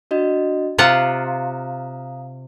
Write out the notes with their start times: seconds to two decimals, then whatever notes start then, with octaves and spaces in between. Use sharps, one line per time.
0.11 D4 F#4 D#5
0.78 C3 F4 F5 F#5 A#5 D#6